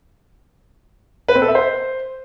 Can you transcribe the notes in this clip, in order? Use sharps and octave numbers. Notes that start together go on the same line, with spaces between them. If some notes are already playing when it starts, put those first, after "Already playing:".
B4
C4
A4
E5
C5